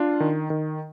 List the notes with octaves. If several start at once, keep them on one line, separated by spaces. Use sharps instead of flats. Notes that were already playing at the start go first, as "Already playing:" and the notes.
Already playing: D4 F4
D#3
D#3